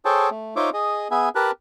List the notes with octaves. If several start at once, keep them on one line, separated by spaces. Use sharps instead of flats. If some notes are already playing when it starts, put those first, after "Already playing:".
G#4 A4 C5 C#5 G5 A5
A3
D#4 F4 C5 C#5 E5 D6
G#4 D#5
B3 G#4 E5 G#5
G4 A#4 B4 A5 F#6